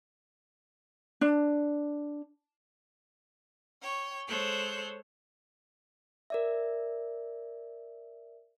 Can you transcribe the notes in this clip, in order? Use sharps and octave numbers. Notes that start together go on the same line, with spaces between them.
D4
C#5 G5
G#3 A4 C5 C#5 F#6 G6
A#4 D5 E5